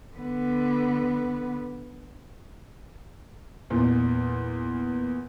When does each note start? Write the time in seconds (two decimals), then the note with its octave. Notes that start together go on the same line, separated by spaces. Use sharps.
0.15 D3 B3
3.70 E2 A#2